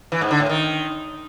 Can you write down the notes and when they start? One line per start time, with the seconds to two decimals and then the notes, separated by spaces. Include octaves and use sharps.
0.12 E3
0.21 G#2
0.31 D3
0.40 A2
0.49 D#3